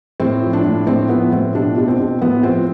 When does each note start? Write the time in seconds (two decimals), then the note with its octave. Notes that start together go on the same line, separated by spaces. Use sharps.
0.20 A2 C4
0.42 F3
0.53 D4
0.64 A2
0.86 A2 C4
1.09 F3 B3
1.32 A2 C4
1.55 B2 D4
1.77 B2
1.88 C4
2.00 B2
2.22 A2 B3
2.43 F3 C4